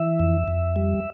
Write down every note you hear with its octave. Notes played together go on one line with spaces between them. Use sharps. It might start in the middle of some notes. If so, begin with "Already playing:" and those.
Already playing: E3 E5
F2
F2
G3